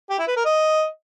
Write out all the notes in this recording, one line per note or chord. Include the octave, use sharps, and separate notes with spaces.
G4
E4
B4
A#4
D#5